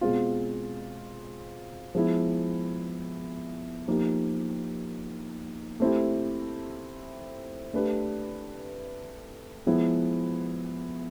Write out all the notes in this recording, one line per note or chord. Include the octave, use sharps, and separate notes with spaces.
B2 G#3 C4 F4
F3 G#3 B3 E4
F3 A#3 D#4 G4
A3 C4 E4 G4
A3 D4 G4 B4
F3 G#3 B3 E4